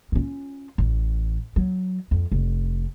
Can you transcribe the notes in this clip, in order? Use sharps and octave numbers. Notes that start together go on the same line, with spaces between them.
C#4 F4
A1
F#3
F2
F1